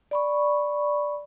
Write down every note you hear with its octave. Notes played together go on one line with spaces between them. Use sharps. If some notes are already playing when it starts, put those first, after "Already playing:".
D5 B5 C#6